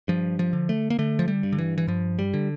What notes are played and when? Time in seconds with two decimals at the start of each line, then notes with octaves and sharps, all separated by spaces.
0.08 G2 F3
0.39 F3
0.53 D3
0.69 A3
0.90 A#3
0.99 D3 A3
1.19 F3
1.28 G3
1.43 G2
1.52 D3
1.58 E3
1.78 E3
1.87 G2 F3
2.19 G3
2.34 D3